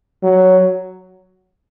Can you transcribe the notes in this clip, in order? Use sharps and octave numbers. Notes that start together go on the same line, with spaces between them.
F#3